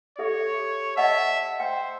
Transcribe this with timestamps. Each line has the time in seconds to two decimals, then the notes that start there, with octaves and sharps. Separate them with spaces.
0.19 G4 A4 C#5 E5
0.97 D#5 E5 F#5 A5
1.60 C5 G5